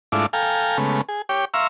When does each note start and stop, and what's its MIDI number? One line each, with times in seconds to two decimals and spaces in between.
0.12 0.26 44
0.12 0.26 57
0.12 0.26 62
0.12 0.26 64
0.12 0.26 65
0.12 0.26 86
0.33 0.77 69
0.33 0.77 77
0.33 0.77 79
0.33 0.77 80
0.33 0.77 82
0.78 1.01 49
0.78 1.01 56
0.78 1.01 57
0.78 1.01 59
1.09 1.22 68
1.29 1.45 67
1.29 1.45 73
1.29 1.45 79
1.29 1.45 86
1.54 1.67 76
1.54 1.67 77
1.54 1.67 82
1.54 1.67 84
1.54 1.67 85
1.54 1.67 88